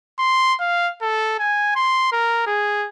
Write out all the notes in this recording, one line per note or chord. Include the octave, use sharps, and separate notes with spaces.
C6
F5
A4
G#5
C6
A#4
G#4